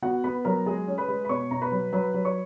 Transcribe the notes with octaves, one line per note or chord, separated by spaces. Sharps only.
B3 F#4 F#5
B3 B4 B5
F#3 A#4 A#5
G#3 G#4 G#5
C#4
B4 B5
G#3
B5
B2 C#5 C#6
B2 A#5
B4 B5
F#3
F#3 B4 B5
F#3
C#5 C#6